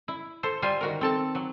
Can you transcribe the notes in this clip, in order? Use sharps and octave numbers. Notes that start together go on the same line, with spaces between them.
E4
A4 C5
G3 F4 C5 G#5
D#3 F#4 A#4
C4 A4 A5
F#3